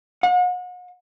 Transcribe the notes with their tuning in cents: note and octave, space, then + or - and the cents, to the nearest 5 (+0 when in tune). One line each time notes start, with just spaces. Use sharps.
F#5 -40